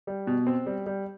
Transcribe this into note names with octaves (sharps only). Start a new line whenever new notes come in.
G3
B2
C4
G3
G3